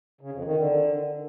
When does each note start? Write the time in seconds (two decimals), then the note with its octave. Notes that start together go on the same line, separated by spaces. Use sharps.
0.21 C#3
0.33 F2
0.45 D#3
0.57 D3